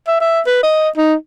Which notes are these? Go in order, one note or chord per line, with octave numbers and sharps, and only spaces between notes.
E5
E5
B4
D#5
D#4